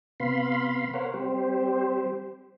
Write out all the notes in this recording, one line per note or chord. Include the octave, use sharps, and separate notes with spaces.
C3 B3 F5 B5 C6
A#4 C5 C#5 F5 F#5
G3 C4 G4 C5